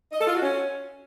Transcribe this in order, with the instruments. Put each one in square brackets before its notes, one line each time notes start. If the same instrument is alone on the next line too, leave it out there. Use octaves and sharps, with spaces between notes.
[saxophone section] D#5
A4
F4
F#4
C#4